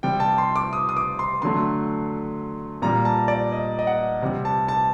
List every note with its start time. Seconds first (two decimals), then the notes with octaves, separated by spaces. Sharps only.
0.03 C3 G3 G5
0.20 A5
0.38 C6
0.56 D6
0.73 D#6
0.89 D#6
0.97 D6
1.19 C6
1.42 D3 F#3 A3 C6
2.82 A#2 G3 A#5
3.05 A5
3.28 D5
3.52 D#5
3.79 D#5
3.87 F#5
4.22 C3 G3
4.45 A5
4.68 A5